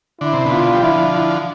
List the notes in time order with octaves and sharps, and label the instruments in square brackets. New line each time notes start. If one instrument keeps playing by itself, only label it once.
[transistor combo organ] D3 [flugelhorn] E4
[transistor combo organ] C3
B2 D3
[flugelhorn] F4
[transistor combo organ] G3
[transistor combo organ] D3 F3 [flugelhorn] E4